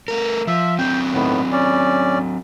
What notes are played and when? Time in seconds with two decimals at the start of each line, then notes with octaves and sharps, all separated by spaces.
0.08 A3 A#4
0.47 F3 E5
0.79 F#3 C4 G5
1.14 A2 D#3 B3
1.52 C#4 D5